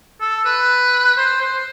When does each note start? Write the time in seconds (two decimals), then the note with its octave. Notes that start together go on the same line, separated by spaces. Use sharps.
0.21 A4
0.45 B4
1.17 C5
1.41 C5